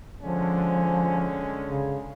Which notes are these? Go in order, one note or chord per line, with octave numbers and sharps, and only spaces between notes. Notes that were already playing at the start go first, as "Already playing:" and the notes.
D3 F3 G#3 C#4
C#3